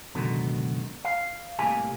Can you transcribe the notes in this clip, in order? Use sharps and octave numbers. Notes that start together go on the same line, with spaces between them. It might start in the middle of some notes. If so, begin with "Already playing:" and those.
C#2 F#2 B2 D3 D#3
F5
C2 A2 A#3 G4 G#5